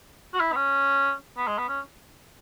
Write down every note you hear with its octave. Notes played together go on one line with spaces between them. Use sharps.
F#4
E4
B3
C#4
B3
G#3
B3
C#4